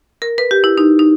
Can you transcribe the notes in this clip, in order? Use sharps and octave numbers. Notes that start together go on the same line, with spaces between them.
A#4
B4
G4
E4
D#4
D#4